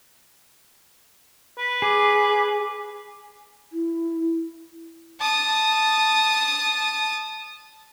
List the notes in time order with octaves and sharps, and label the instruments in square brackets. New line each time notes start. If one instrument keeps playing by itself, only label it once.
[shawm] B4
[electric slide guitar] G#4 [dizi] D6
[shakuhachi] E4
[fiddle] A5 D#6